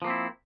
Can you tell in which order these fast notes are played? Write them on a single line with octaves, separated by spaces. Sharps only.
F3 A#3 C4 E4